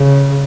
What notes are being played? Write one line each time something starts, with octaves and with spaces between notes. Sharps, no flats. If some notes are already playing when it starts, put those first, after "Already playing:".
Already playing: C#3